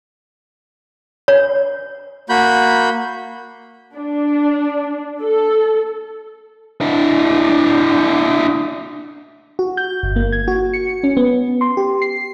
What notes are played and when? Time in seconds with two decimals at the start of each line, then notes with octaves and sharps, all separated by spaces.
1.28 C#5
2.29 A#3 F#4 B5 G6
3.95 D4
5.23 A4
6.81 D4 E4
9.59 F#4
9.77 G6
10.03 G1
10.16 A#3
10.33 G#6
10.48 F#4
10.74 C#7
11.04 C#4
11.17 B3
11.61 C6
11.77 G4
12.02 C7